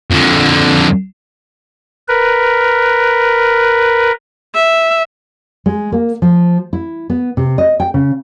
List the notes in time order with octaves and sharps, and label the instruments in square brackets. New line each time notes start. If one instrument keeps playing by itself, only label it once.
[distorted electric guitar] F2 D3
[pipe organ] A#4 B4
[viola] E5
[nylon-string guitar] G#3
A#3
F3
E4
B3
C3
D#5
G5
C#3